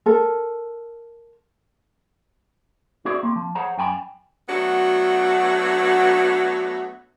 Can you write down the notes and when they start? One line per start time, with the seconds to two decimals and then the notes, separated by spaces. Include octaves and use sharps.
0.06 A4 A#4
3.05 E4 F#4 G#4 C5 D5
3.23 A#3 C4
3.36 F3
3.55 G#4 C5 C#5 F#5 A#5
3.78 F#2 G5 G#5 B5
4.49 F#3 A3 B3 D4 F#4